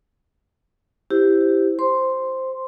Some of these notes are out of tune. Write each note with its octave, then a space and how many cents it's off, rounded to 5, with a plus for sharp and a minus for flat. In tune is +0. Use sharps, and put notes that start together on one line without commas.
E4 +0 G4 +0 C5 -15
C5 +0 C6 +0